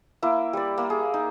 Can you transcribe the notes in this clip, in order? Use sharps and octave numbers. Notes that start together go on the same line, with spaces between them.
A#3 E4
G3 D5
A#3
G#4
D#4